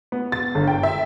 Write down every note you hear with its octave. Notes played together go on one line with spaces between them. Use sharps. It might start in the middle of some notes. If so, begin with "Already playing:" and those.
B3
A6
G1
G5
E5